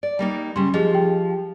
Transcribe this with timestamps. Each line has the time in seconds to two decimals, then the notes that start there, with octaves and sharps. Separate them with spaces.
0.03 D5
0.19 G3 A#3 D#4
0.56 C#3 G3 C6
0.74 F3 G4 G#4 D#5
0.91 G4 G5